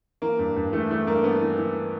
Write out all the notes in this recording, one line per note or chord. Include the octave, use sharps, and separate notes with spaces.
E3 A#3
G2
G2
E3 A3
E3 A3
G2 A#3
G2 B3
E3
E3